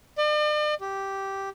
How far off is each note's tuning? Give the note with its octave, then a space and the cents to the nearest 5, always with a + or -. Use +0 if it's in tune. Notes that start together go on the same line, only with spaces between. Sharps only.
D5 +45
G4 -5